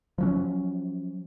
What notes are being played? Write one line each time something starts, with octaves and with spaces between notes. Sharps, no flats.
F3 F#3 C#4